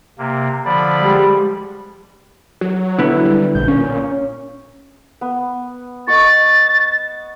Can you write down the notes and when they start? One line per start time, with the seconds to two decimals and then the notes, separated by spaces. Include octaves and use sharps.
0.19 C3 A#3
0.65 D3 F3 D5 B5
1.00 G3 G#3
2.61 F#3
2.99 D3 B3 E4
3.25 G3
3.55 A#1 G6
3.68 A#2 C#4
5.21 B3
6.08 D#5 F#5 C#6 A6